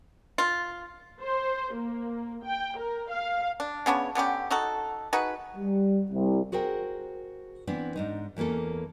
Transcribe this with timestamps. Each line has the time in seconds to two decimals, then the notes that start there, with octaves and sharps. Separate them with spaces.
0.38 F4
1.22 C5
1.75 A#3
2.45 G5
2.78 A#4
3.10 F5
3.60 D4
3.86 C#3 B3 D4 C#5
4.15 D3 B3 C#4 G4
4.50 D#4 F#4 A4
5.13 D#4 F#4 G#4 B4
5.56 G3
6.11 C2
6.52 F#4 G#4 A#4 C5 G5
7.67 E3 B3 C4 D4 E4
7.96 G#2 D4 D#4
8.36 E2 E3 A#3 C#4 A4